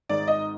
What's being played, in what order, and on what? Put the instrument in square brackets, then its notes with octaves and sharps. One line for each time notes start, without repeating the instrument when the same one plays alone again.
[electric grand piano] G#1 G#2 D#3 G#3 D#4 [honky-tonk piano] D5
[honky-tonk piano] D#5